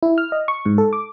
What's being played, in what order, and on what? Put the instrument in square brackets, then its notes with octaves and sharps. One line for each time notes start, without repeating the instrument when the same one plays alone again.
[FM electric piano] E4
F6
D#5
C#6
G#2
A4
D6